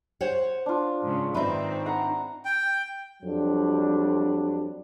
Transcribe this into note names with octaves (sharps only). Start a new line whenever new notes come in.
C5 C#5 F#5
D4 F4
G#2 C#3
G#2 D#3 C4 D#4 B4 D5 E5
F#5 A#5
G5
F2 F#3 G3 D4